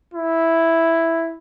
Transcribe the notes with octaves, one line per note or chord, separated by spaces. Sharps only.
E4